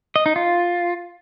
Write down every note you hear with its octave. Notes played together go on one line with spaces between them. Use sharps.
D#5
D#4
F4